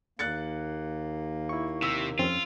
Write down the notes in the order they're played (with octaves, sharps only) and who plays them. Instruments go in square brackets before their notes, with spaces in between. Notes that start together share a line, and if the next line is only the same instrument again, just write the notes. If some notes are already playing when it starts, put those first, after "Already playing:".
[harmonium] D#2 A#3 [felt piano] F#6 A6 C#7
[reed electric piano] E4 C#6
[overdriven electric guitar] C3 [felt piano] E6
[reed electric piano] F2 C4 C#4 [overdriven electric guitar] F4